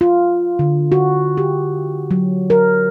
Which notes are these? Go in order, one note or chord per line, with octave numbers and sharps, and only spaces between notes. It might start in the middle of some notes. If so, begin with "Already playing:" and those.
F4
D3
F#4
G4
F#3
A#4